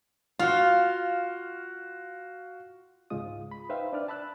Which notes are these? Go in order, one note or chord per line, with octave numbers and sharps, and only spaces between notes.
F4 F#4 F5
C#2 G#2 G#3 F4 D#6
B5
D#4 B4 C5 E5 F5 G5
D4 B4 D5 F6
A5 B5 E6 F#6